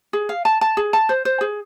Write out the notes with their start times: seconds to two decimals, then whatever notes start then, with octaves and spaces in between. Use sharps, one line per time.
0.13 G#4
0.29 F5
0.45 A5
0.61 A5
0.77 G#4
0.93 A5
1.09 C5
1.25 C5
1.41 G#4